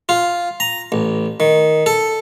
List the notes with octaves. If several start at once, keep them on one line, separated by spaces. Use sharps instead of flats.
F4
A#5
A1
D#3
A4